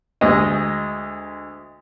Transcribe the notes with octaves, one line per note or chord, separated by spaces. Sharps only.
D2 G#3 D#5